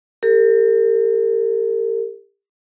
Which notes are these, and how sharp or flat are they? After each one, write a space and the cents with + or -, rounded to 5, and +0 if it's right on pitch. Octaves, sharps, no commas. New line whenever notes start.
G4 +25 A#4 -40